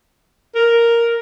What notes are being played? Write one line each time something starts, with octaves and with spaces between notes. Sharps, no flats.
A#4